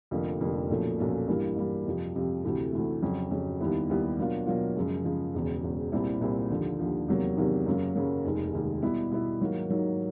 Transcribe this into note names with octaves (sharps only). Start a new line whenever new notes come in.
F1 F2 D3 F3 A#3
F1 F2 D3 F3 A#3
B1 A#2 F3 A3 C#4
B1 A#2 F3 A3 C#4
G2 E3 G3 A#3
G2 E3 G3 A#3
F2 C3 F3
F2 C3 F3
D2 C3 E3 A3
D2 C3 E3 A3
F2 C#3 F#3
F2 C#3 F#3
D#2 D#3 G3 B3 E4
D#2 D#3 G3 B3 E4
B2 F#3 A#3 D4 F4
B2 F#3 A#3 D4 F4
F#2 C#3 F3 G#3
F#2 C#3 F3 G#3
E1 E2 C#3
E1 E2 C#3
C2 A#2 G3 C4 E4
C2 A#2 G3 C4 E4
D#2 D3 F3
D#2 D3 F3
E2 C3 D#3 F#3 A#3
E2 C3 D#3 F#3 A#3
F#2 C#3 F#3 A#3
F#2 C#3 F#3 A#3
F1 D#2 D#3 G#3
F1 D#2 D#3 G#3
B2 G3 B3 E4
B2 G3 B3 E4
G#2 D#3 F#3 A#3
G#2 D#3 F#3 A#3